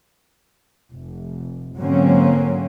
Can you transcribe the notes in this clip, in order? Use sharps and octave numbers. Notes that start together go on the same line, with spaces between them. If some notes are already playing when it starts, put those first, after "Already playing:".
F1
G#2 D3 F#3 A#3 C4 C#4